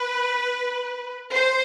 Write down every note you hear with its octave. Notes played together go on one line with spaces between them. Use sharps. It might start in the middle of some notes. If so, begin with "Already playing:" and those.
Already playing: B4
C5